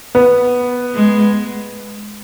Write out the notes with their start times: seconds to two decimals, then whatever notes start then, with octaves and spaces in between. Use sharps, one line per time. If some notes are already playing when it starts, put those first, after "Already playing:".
0.15 B3
0.95 G#3